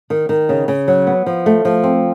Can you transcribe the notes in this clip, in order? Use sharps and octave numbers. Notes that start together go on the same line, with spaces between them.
D#3
D#3
C#3
C#3
F#3
B3
F3
A3
F3
C4